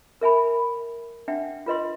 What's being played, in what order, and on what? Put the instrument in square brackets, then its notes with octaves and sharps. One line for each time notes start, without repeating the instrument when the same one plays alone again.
[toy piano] A#4 E5 G#5 B5
D4 E5 F#5 G5
F4 B4 D#5 C6